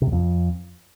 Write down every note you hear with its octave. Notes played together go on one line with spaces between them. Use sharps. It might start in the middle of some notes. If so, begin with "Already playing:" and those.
C3
F#2
F2